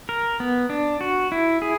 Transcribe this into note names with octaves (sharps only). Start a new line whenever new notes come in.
A#4
B3
D4
F#4
E4
G#4